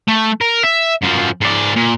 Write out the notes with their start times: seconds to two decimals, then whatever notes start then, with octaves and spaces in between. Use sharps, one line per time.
0.08 A3
0.41 A#4
0.63 E5
1.03 F#2 F3
1.41 G#2 D5
1.76 A#2